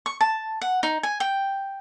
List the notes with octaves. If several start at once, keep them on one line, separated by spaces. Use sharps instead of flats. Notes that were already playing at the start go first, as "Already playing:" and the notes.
C#6
A5
F#5
D#4
G#5
G5